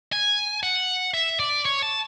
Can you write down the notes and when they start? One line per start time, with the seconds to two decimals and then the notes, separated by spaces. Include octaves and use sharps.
0.12 G#5
0.63 F#5
1.14 E5
1.40 D5
1.65 C#5
1.82 A5